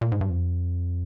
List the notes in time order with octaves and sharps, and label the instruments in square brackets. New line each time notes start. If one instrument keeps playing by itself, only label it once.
[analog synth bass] A#2
G#2
G2
F2